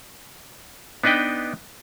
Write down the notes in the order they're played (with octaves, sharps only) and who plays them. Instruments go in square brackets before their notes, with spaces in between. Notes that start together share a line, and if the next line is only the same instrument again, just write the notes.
[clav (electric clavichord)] B3 D4 D#4 B4 G5